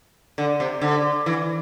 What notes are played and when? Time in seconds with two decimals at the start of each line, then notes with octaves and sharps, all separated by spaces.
0.38 D3
0.60 C3
0.81 D3
1.26 E3